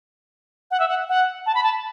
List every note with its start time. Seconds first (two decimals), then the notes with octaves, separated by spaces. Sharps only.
0.71 F#5
0.80 E5
0.88 F#5
1.09 F#5
1.46 A5
1.55 B5
1.63 A5